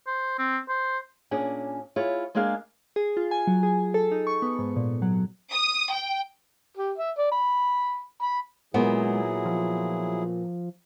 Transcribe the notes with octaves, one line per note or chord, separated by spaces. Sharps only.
C5
C4
C5
A#2 C#4 D4 G#4
E4 F4 G#4 C#5
G#3 A#3 D4 G#4 F5
G#4
F4
G#5
F#3
G#4
A4
D#4
C#6
B3
G#2
A#2
F#3
D#6
G5
G4
E5
D5
B5
B5
A#2 F#3 G#3 B3 E4 G#4
F3